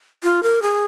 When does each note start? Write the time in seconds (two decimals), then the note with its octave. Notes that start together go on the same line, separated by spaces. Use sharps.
0.23 F4
0.43 A#4
0.62 G#4